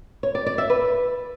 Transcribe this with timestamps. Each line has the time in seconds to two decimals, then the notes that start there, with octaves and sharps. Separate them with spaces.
0.23 C#5
0.35 D5
0.46 D5
0.58 E5
0.70 B4